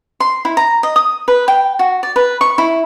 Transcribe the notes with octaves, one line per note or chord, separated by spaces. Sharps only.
C6
E4
A#5
D#5
D#6
B4
G5
F#4
D5
B4
C#6
E4